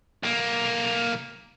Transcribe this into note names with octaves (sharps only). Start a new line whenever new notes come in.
B1 A#3